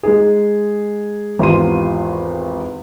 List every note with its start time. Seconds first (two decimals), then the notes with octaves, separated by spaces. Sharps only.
0.03 G#3 D#4 G#4
1.39 G#1 E2 F4 G4 C6 D#7